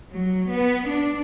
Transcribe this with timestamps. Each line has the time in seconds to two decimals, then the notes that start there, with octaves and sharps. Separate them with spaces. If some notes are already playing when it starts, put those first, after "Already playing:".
0.12 F#3
0.51 B3
0.90 D4